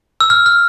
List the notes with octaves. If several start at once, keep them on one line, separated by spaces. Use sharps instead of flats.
E6
F6
F6